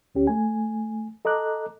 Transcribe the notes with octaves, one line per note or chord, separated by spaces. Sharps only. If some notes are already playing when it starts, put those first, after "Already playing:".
D2 C#4 G4
A3 G#5
A4 D#5 A#5 D6 F#6